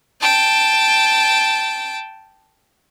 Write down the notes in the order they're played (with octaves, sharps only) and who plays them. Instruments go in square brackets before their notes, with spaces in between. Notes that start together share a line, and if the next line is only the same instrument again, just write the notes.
[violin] G5 A5